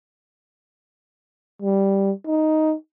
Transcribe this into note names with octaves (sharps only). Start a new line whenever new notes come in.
G3
D#4